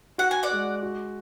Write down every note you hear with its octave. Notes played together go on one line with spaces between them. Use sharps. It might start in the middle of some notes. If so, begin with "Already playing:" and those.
F#4 F#5
G#5
D5 F#5
G#3
F#4